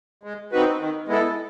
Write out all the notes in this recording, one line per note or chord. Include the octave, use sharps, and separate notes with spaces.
G#3
C4 D#4 F#4 B4
D#3
G#3 B3 E4 A4